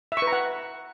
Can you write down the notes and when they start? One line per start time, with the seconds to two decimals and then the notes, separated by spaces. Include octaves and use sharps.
0.12 E5
0.17 C#6
0.22 B4
0.27 A#5
0.32 F#5